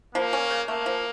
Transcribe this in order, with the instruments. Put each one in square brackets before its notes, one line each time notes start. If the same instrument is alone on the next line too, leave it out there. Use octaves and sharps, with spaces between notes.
[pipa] F3 [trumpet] A#3
[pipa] C#4
C#3
[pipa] A3 [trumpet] A#3
[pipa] F3